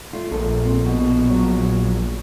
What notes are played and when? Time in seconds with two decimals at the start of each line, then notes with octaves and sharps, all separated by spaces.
0.13 A3 F4
0.31 A#1 A4
0.65 C4
0.86 B2
1.30 F#3